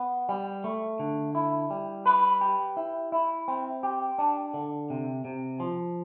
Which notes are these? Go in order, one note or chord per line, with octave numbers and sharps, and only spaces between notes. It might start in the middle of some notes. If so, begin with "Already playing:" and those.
Already playing: B3
G3
A3
D3
E4
G3
B4
G4
E4
E4
C4
G4
D4
D3
C3
C3
F3